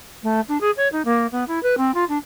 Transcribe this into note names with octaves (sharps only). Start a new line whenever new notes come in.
A3
D4
G#4
C#5
D#4
A#3
B3
E4
B4
C4
F4
D4